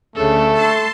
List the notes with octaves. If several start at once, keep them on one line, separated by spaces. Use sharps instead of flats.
D2 C#3 A3 A4
A5 C6